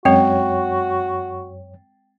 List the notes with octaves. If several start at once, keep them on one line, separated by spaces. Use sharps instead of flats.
F#2 G#3 C4 F#4 C#5 G5